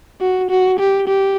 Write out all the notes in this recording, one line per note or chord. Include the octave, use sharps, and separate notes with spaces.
F#4
F#4
G4
G4